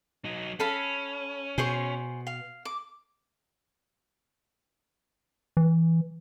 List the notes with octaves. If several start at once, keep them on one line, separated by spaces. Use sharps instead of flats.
F#3 D#4
C#4 A4 F5 B5
B2 G#4 C5 C#6
F5
D6
E3